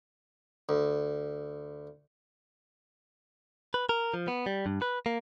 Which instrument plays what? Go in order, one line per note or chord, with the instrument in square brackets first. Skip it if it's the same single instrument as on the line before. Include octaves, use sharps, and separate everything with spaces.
[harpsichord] D2
[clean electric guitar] B4
A#4
F3
B3
G3
G2
B4
A#3